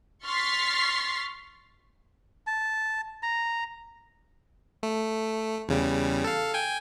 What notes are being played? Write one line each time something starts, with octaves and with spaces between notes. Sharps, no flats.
C6 C#6 F6 A6 B6 C7
A5
A#5
A3
E2 C#3 G3
A4 F5
G5 G#5